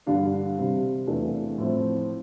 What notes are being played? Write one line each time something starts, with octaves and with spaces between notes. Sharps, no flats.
G2 D3 G3 D4 F5
C3 G3 C4
E2 C3 E3 A3 D4
A2 F3 C4